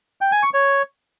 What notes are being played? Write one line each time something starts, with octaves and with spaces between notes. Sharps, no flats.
G5
G#5
C#6
C#5